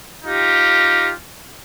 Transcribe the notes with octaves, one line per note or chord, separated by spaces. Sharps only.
D#4 F4 G4